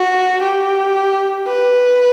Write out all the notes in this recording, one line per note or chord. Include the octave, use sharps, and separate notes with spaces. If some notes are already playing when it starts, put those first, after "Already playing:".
Already playing: F#4
G4
B4